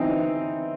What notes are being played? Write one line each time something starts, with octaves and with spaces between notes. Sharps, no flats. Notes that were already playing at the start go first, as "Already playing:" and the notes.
Already playing: E3 C4 D#4